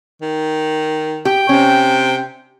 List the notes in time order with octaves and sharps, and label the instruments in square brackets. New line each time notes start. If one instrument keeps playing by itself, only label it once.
[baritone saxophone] D#3
[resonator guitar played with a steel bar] G4 [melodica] G5
[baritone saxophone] C3 [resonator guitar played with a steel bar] C#4